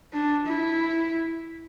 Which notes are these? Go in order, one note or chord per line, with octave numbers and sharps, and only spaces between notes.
D4
E4